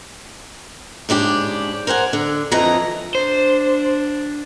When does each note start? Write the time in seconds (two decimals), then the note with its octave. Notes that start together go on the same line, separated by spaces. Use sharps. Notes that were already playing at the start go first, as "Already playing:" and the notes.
1.09 G#2 C#3 D4 G4
1.87 A#4 C5 F#5 G#5
2.13 D3
2.51 F2 E3 D#5 A#5
3.15 D4 C5